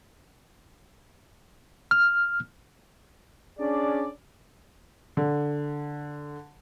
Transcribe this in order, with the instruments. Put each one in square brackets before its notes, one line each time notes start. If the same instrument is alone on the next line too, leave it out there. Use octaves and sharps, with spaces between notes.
[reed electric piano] F6
[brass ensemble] C#4 D4 G#4 D5
[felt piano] D3